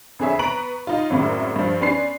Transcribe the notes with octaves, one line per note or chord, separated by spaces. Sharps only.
F2 D3 G#4 C#5 E5
B3 B4 A#5 C#6 D7 F#7
D#4 F4
G#1 F#2 A2 C#3
G2 F3
B3 C#4 D4 C6 C7